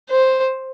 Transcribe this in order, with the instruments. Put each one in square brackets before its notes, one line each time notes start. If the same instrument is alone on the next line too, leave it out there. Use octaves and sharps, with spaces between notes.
[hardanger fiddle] C5